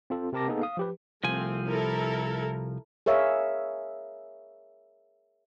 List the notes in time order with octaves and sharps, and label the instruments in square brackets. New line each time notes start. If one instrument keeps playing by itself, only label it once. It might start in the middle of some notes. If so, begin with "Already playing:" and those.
[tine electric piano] C4 F4 A4
C3 C4 A#4 A5 D6 A#6
A#3 B3 D#4 G#4 A4
F5 D#6
F3 G4 B4
[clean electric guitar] C2 F3 G#5 [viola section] A3 C4
[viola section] E4 A4 A#4
[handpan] G#4 A#4 C#5 E5 F5